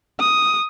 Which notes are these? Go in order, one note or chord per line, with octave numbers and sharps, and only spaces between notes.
D#6